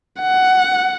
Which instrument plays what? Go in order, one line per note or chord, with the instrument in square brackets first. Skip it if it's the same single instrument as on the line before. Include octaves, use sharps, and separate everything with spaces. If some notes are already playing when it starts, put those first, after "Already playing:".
[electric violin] F#5